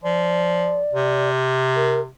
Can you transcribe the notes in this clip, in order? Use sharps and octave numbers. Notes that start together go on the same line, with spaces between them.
F3 D5
C3
A#4